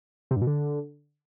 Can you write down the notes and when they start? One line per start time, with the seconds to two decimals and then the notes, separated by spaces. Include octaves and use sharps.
0.31 C3
0.36 G2
0.42 B2
0.47 D3